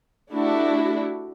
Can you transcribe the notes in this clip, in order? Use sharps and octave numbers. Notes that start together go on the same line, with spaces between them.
A3 D4 E4 F#4 G4